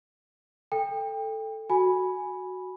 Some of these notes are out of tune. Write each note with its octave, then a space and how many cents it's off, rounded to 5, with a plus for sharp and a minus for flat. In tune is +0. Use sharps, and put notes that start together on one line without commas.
A4 +0 G5 +25
F#4 +0 G#5 +0 B5 -5